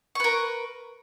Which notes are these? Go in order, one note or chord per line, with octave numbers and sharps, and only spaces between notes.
A#4 B4 C#6